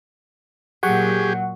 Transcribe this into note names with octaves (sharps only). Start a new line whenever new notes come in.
A#2 F#3 G4 G#4 F#5 C#6